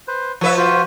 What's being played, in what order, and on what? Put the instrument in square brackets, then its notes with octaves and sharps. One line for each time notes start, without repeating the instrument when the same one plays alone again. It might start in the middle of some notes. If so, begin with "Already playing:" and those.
[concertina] B4 C5
[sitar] F3 B4 E5 [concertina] C#5
[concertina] F4 F#4 C5